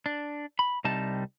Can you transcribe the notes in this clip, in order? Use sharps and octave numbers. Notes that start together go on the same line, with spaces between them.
D4
B5
C2 C3 G3 D#4 A5